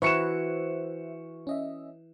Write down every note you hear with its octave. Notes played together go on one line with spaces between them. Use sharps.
E3 F#4 C5 E5 C#6 C#7 E7
C#4 D#5 E5